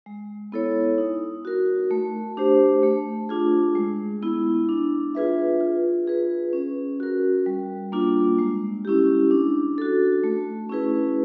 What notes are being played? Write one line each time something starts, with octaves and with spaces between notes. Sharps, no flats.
G#3
B3 E4 A4 C#5
D#4
F#4 A#4
A3
D4 G4 C5
A3
D4 F4 G#4
G#3
B3 E4
D4
F4 G#4 B4 E5
F4
G#4 B4
C#4
F#4 A#4
G3
A#3 D4 F4
G#3
C#4 E4 G4
D4
F#4 A4
A3
C#4 E4 G#4 B4